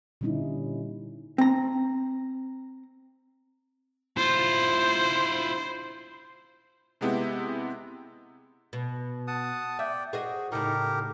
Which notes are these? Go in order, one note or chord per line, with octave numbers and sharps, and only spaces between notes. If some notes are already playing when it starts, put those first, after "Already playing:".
A#2 D3 G3 C#4 D#4 E4
C4 A#5
E4 F4 C5
C3 G#3 B3 E4 G4
B2
F#5 A5 D#6
D5 E5 G5
F#4 G#4 C5 D#5
A2 C#3 D#4 G4 A#4